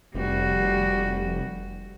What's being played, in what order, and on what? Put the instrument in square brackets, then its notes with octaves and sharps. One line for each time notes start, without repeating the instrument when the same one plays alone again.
[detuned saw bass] F1 [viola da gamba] G3 F#4